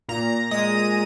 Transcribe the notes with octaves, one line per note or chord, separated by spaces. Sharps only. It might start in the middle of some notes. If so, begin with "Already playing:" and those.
A#2 A#5
G#3 D#6